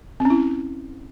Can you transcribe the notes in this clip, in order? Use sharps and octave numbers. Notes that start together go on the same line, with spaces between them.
C4
C#4
E4